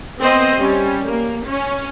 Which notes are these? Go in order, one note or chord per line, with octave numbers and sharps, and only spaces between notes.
B3 C4 C5 D#5
G3 C#4
A#3
C#4